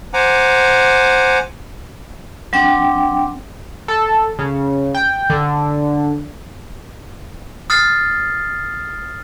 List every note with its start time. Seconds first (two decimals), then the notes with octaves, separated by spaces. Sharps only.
0.14 C5 F#5 G#5 A#5 D6
2.53 F#3 C4 D4 G5 D6
3.88 A4
4.39 C#3
4.94 G5
5.30 D3
7.70 D#6 F6 A6 C7